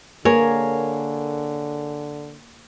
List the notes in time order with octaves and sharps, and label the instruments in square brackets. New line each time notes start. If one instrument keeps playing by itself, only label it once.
[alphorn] D3 [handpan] A#3 [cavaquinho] G#4 C#5 [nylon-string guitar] A#4